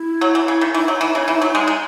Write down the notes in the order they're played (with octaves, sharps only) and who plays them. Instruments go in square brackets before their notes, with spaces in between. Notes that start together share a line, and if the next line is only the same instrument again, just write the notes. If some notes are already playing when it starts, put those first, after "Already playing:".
Already playing: [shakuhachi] E4
[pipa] F#3
E3
C#3
D#3
[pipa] E3 [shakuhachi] D#4
[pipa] F#3
E3
C#3
E3
F#3
G#3
G#3